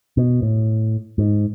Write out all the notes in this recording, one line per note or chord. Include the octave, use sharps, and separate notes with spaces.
B2
A2
G#2